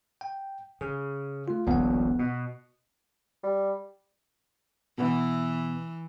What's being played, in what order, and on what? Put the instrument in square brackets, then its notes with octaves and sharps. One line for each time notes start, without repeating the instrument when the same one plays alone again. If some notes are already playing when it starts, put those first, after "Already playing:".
[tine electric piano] G5
[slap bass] C#3 [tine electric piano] G#4
[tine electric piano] A3 F4
[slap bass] D#1 A#1 [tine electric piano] B3 F#5
[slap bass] B2
[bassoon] G3
[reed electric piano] B2 B3 [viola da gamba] E3